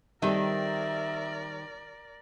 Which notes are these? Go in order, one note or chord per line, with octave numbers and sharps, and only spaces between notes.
D#3 G3 C4 A4 A#4 D5 E5